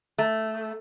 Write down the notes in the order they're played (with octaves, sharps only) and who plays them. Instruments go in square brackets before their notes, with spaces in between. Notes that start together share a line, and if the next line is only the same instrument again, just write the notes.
[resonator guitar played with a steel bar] A3